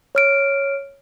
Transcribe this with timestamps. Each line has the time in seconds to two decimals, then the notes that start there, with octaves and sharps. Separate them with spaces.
0.15 C#5 F6 D7